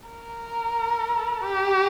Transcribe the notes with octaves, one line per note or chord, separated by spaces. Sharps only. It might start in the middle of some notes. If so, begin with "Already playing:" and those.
A#4
G4